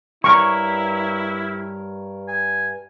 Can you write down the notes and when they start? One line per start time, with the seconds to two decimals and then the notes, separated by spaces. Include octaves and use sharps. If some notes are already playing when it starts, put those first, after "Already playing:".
0.24 G2 E4 A#4 C#5 C#6
2.28 G#5